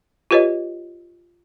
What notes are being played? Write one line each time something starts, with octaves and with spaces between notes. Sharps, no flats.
F4 G4 B4 C#5 D#5